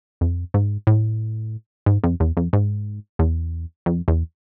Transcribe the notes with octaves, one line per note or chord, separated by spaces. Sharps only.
F2
G#2
A2
G#2
F2
E2
F2
G#2
E2
F2
E2